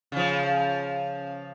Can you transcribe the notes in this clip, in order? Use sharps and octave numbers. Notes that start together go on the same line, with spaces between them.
C#3 F3